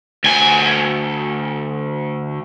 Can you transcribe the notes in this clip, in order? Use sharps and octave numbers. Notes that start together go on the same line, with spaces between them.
D2 G#5